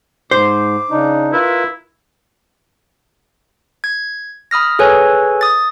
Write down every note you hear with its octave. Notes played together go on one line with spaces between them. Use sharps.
G#2 C5 D6
C#3 D4 D#4
E4 F4 A#4 B4
G#6
B5 D#6 F6 A#6
G#4 A4 B4 C#5 G#5
D#6 A6